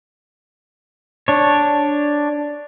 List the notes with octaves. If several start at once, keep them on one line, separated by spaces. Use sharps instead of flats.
D4 C#5